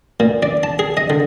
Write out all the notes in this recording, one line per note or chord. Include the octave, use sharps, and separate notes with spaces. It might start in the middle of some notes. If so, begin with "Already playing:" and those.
A#2
D5
A5
G#4
D#5
D3